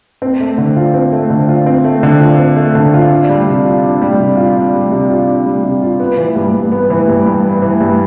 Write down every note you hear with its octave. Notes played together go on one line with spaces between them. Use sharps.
C4
A3
D3
F4
C4
A3
D3
F4
C4
A3
D3
F4
C4
A3
D3
F4
D4
G3
C3
F4
D4
G3
C3
F4
D4
G3
C3
F4
D4
G3
C3
F4
B3
E3
G2
G2
B3
E3
G2
G2
B3
E3
G2